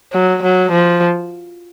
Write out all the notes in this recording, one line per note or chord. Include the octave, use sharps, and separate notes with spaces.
F#3
F#3
F3